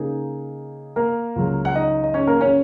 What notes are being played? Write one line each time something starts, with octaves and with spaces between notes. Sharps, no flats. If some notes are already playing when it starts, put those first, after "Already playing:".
Already playing: C#3 A#3 D#4 G#4
A#3 A#4
C#2 C#3 F#3
F#5
D#4 D#5
D#5
C#4 C#5
A#3 A#4
C#4 C#5